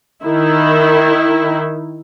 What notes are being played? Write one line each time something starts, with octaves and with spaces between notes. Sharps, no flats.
D#3 E4